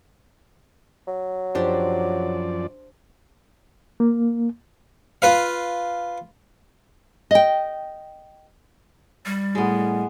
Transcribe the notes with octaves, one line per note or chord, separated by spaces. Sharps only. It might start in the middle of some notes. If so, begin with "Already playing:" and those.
F#3
F#2 F3 D4 G4 C5 D5
A#3
F4 B4 F5
D#5 G5
G3
A2 G#3 B3